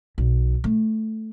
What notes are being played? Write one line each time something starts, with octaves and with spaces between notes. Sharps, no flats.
B1
A3